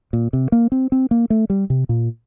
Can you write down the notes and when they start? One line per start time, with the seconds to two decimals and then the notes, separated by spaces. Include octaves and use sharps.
0.13 A#2
0.33 C3
0.52 A#3
0.72 C4
0.92 C4
1.11 A#3
1.30 A3
1.50 G3
1.70 C3
1.89 A#2